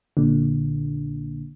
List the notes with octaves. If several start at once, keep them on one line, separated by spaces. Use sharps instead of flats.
A#1 A#2 D3